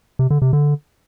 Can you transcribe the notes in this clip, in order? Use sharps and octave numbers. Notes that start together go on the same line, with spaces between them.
C3
D3
C3
D3